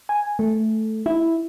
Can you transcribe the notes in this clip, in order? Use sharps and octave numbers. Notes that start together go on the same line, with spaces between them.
G#5
A3
E4